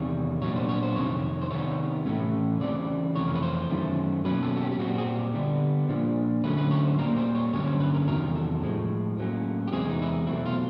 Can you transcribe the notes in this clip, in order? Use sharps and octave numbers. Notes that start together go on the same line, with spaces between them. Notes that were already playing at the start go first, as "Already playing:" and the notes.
Already playing: E2 C3 D#3 G3 C#5
A#2 F#3 B3 D4 C#5
C5
C#5
C5
F2 C3 D#3 C#5
C5
C3 D#3 G3 B3 C#5
A2 E3 A3 C#4
C#3 E3 G3 C4 D5
F2 C3 E3 A3 C#5
A#4
B4
C5
F#2 D#3 F#3 A3 C#4
B2 F#3 A#3 C#4 B4
A4
F#4
G4
G4
A#2 G3 C4 F#4
G#4
G4
D3 G3 B3 D4
A#2 F3 A#3 D4
D3 F#3 A3 C#4 B4
B4
C#5
C5
A#2 G3 A#3 A#4
C5
C#5
G2 D3 F#3 A#3 C#4 C#5
C5
B4
A#4
A4
E2 C3 D#3 F#3 A#4
A4
A2 F3 G#3
A2 F#3 A#3 C#4
G4
E2 C3 E3 G#3 C4 G#4
D#4
E4
D#4
B2 F#3 A3 C4 E4
F4